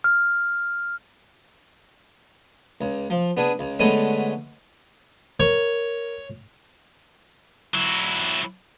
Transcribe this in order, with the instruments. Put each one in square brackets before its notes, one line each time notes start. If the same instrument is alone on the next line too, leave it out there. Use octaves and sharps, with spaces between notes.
[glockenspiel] F6
[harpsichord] C#2
F3
B3 D4 G#4
C#2
D3 G#3 A3 B3 C#5 G#5
[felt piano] A#4 [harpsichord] C#5
[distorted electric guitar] F#3 E4